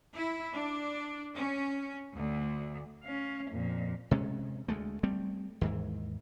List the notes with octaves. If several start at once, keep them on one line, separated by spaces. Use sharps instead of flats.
E4
D4
C#4
D2
C#4 F5
F2 A#2
C3 G#3 C#4
D2 G#3 A3
G3 A3 C4
D#2 G#2 E3